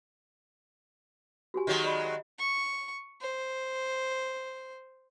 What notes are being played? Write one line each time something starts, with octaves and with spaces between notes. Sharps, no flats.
F#4 G4 G#5
D#3 F#3 G#3
D5 D#5 B5
D#5 E5
C#6
C5